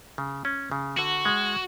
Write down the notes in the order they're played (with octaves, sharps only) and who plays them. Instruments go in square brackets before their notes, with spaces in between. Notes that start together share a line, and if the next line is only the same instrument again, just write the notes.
[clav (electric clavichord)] C#3
C#4
C#3
[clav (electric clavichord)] D3 [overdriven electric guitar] F#4
[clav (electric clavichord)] G#3